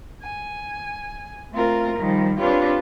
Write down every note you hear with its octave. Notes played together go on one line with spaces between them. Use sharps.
G#5
A3 C4 F4 A#4
D#3 F3 G3
C4 D4 F4 G4 B4 C#5